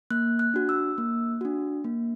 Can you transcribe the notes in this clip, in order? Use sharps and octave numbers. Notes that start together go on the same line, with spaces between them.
A#3 F#6
F#6
D4 F#4
E6
A#3
D4 F#4
A#3